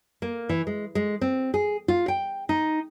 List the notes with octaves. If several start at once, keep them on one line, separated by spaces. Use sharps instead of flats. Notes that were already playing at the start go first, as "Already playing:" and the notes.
A#3
E3
G#3
G#3
C4
G#4
F4
G5
D#4